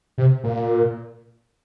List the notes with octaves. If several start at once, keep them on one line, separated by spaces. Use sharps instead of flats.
C3
A#2